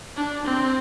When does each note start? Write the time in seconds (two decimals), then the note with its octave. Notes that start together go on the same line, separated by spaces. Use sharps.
0.17 D4
0.45 C4